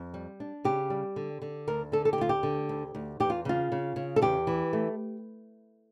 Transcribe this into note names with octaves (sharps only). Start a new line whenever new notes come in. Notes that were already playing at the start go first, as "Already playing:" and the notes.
Already playing: F2
G3
D4
C#3 G4
G3
D3
D3
D2 A#4
D3 A4
A4
G4
D2 F4
G4
D3
D2
D2
E2 G4
F4
C#3 F4
C#3
C#3
A4
E2 G4
E3
A3